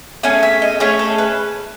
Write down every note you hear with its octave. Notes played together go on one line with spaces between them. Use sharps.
A3 C#4 G#4 G#5
E5
D#5
A3 C#4 G#4 C#5
A4
B4